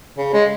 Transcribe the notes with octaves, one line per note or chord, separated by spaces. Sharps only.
C#3
G#3